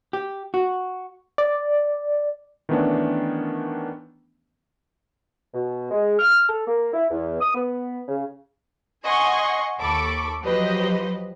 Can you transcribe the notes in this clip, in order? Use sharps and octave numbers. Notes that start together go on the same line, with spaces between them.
G4
F#4
D5
D#3 E3 A3 B3 C#4 D4
B2
G#3
F6
A4
A#3
E4
E2
D#6
B3
C#3
D#5 F#5 G#5 C6 C#6
D#2 A4 B5 C#6 D6
F3 F#3 G4 B4 C5 D#5